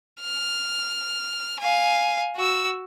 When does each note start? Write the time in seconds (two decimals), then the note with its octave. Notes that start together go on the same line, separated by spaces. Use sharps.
0.21 F6
1.59 F5 G#5
2.36 F#4 E6